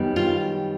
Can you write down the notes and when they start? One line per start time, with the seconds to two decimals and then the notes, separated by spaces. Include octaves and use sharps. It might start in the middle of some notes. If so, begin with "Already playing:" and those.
Already playing: F#2 D#3 G3 B3
0.16 F4